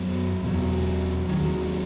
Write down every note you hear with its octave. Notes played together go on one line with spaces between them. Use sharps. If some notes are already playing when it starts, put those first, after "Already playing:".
Already playing: F#2 F#3 B3
E2 B2 F#3
D#2 D#3 F#3